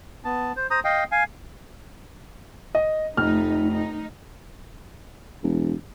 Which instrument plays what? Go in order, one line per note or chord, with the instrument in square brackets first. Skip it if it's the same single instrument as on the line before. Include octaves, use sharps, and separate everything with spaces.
[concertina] B3 A5
C5
C5 A#5 D#6
D#5 F5 G5
F5 G#5
[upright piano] D#5
[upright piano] F1 F6 [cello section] A3 D#4
[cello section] D#4
[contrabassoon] E1